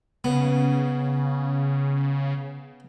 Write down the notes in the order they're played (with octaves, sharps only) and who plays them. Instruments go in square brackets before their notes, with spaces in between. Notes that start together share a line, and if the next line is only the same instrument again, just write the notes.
[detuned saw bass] C#3 [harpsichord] B3